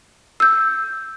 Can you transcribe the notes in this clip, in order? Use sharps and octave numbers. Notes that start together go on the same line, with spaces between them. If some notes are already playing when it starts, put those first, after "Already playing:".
E6 G6